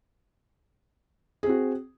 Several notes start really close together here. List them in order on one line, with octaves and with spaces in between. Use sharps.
G#4 C4 F#4